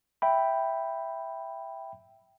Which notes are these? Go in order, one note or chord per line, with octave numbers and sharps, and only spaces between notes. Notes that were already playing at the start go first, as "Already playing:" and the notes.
E5 G5 B5